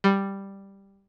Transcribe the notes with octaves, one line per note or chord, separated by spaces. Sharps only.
G3